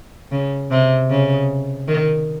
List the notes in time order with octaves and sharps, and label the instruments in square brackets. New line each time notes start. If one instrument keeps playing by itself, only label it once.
[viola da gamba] C#3
C3
C#3
D#3